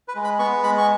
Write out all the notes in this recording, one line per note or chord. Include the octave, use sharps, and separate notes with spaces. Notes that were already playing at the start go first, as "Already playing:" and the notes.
B4
G#3
B5
B3 C#6
G#3 B5
C#6